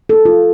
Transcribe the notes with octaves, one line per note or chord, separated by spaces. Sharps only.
A4
F4